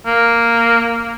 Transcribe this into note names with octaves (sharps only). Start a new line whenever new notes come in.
A#3